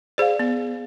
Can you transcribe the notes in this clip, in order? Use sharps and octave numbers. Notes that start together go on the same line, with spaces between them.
G#4 C5 D5 F5
B3